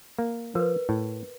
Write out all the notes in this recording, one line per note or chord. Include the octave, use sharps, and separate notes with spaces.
A#3
F3 A#4 B4
A2